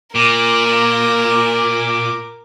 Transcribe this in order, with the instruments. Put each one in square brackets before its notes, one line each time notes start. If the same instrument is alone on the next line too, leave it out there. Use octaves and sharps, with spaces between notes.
[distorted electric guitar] A#2 [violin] A#4 [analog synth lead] D6